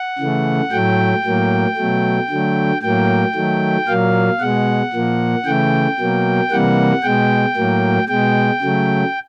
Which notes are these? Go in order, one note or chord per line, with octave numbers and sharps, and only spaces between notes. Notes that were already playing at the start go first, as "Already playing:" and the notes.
Already playing: F#5
C#3 E3 A3
A2 F#3 A3 G5
A2 F#3 A#3
B2 F#3 A3
D3 F#3 A3
A2 F#3 A#3 G5
D#3 F#3 A3
A#2 F#3 A#3 F5
B2 G#3 F#5
A#2 F3 A#3
C#3 E3 A3 G5
B2 F#3 A#3
C3 E3 G3 A#3 F#5
B2 G#3 G5
A2 F#3 A#3
B2 G#3 G5
C#3 F#3 A3